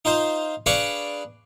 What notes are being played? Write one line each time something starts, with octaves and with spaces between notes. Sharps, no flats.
D#4 F4 C5
D4 G#4 B4 D5 F5 C#6